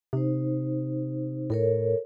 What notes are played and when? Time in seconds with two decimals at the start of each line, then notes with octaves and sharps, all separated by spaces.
0.13 C3 D#4 C5
1.50 A2 A4 A#4 C#5